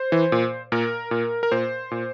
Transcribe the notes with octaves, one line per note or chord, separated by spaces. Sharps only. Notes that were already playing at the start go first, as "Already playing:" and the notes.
Already playing: C5
E3
A#2
A#2 A#4
A#2
A#4
A#2 C5
A#2